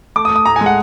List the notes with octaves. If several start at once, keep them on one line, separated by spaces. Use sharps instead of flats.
A3 D6
D#6
A3
D#6
A2 A#5
G#3 G#5
F#5